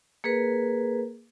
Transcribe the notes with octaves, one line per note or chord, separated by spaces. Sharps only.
A#3 G#4 A#4 B4